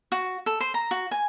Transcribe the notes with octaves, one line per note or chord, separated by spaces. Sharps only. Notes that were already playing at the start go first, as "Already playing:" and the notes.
F#4
A4
C5
A#5
F#4
G#5